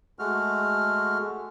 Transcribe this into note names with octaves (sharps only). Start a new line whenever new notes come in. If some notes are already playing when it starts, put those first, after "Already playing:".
G#3 A3 F#4 F6